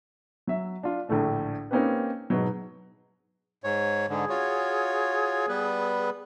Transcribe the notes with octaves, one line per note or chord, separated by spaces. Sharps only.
F#3 E5
D4 F4
A#1 A2 D3 A3 D4
A#3 C4 C#4 D#4 G4 B4
G#2 B2 F#3
G#2 C#5
G#2 D3 G#4
F4 F#4 C#5
G3 B3 B4